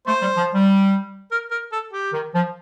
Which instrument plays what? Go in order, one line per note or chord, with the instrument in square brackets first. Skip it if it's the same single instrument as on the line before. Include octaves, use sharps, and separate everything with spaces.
[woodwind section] A3 [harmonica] C5
[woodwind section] G3
F3
G3
[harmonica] A#4
A#4
A4
G4
[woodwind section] D#3
F3